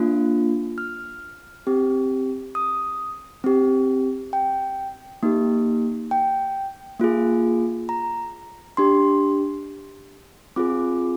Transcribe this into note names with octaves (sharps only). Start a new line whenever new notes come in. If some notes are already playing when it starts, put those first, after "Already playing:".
Already playing: A#3 D4 F4
F6
C4 G4
D#6
C4 G4
G5
A#3 D#4 G4
G5
A#3 F4 G#4
A#5
D4 G4 C6
C4 F4 G#4 D6